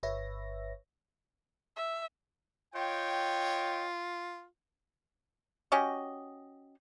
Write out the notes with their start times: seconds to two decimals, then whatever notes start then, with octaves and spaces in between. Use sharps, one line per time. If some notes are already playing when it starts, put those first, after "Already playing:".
0.03 G1 B4 C#5 E5 A#6
1.76 E5
2.75 F4 C#5 D#5 G5
5.72 C#4 F#4 G4 D#5